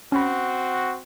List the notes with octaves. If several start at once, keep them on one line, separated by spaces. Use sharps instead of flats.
C4 C#4 F#4 B5